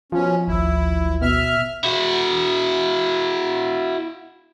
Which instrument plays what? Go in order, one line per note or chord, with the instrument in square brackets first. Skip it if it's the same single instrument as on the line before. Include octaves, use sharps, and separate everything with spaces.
[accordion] B2 C#4 [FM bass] F3
[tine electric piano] G#1 D2 E6 [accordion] E4
[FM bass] B2 [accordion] E5 F6
[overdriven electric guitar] E4 F#4